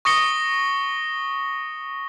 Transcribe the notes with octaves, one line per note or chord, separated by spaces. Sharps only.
C#6 D#6 A#6 C#7 G7